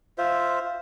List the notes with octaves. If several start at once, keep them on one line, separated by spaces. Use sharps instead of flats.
F4 C5 E5